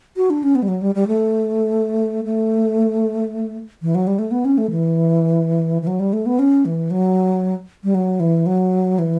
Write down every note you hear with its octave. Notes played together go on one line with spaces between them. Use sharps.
F#4
D4
C#4
B3
G3
F#3
G3
G3
A3
A3
E3
F#3
G3
A3
B3
C#4
A3
E3
E3
F#3
G3
A3
B3
C#4
E3
F#3
G3
F#3
E3
F#3
E3